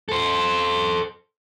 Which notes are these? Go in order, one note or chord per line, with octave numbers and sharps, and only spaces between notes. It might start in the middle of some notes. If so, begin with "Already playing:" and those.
A4 C5